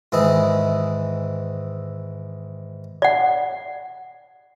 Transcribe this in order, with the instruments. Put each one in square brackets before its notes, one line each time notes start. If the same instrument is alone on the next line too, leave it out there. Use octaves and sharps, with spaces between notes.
[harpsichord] G#2 D#3 E3 E4 G#4
[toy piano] D5 F#5